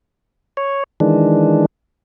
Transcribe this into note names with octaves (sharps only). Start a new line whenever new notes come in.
C#5
D#3 E3 G#3 D4